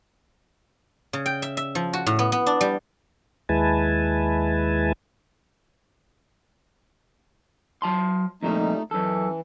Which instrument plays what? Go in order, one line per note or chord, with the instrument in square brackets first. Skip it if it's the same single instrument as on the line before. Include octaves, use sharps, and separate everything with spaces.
[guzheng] C#3
G5
E5
E5
F3
F#4
A2
B3
B3
D4
G3
[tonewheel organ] D#2 G#3 E4 B4 G#5 A5
[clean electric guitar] F#3 A5 C6
[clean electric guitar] F2 A#2 G3 [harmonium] A3 D#4
[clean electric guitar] F#2 A4 [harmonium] E3